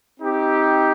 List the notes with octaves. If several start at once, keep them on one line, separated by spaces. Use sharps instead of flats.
C4 D#4 G4